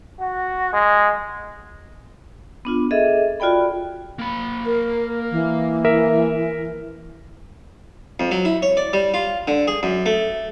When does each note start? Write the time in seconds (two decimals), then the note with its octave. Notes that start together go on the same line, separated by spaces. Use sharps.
0.20 F#4
0.73 G#3
2.65 B3 D4 F4
2.91 G#4 A4 D#5 E5
3.40 F4 F#4 D5 G5 B5
4.19 A#3 B5
4.66 A#4
5.31 E3
5.85 A#4 E5
8.20 F2
8.31 F#3
8.45 E4
8.62 C#5
8.77 D5
8.93 G3
9.14 F4
9.48 D3
9.67 G#4
9.83 F#2
10.06 A3